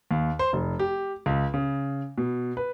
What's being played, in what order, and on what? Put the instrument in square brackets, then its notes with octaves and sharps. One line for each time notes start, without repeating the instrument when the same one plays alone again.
[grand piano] D#2
C5
F1
G4
C#2
C#3
B2
B4